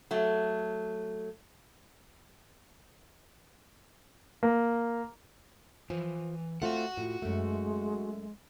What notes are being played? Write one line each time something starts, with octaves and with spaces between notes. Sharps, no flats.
F#3 A3
A#3
E3 F3
A3 C4 F4 F#4 F#5
A2 F4
F#2 G#3 A3